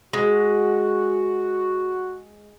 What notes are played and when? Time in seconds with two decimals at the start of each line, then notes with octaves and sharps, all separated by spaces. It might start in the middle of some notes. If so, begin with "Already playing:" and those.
0.13 G#3 F#4